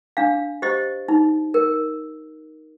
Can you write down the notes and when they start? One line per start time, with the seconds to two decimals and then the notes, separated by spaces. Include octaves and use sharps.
0.17 D4 F5
0.62 G4 C5 D#5
1.08 D#4
1.54 A#4